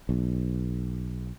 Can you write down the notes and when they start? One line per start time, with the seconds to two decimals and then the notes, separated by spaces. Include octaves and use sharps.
0.09 B1